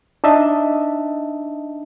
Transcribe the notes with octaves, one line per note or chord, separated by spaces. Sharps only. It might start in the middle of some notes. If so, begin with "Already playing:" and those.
D4 D#4 D#5 E5 A5